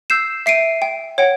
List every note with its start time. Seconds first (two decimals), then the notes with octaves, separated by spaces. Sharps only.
0.10 E6 G6 C7 E7
0.46 E5 C7 D7 D#7
0.82 G5
1.18 C#5 F#5 G5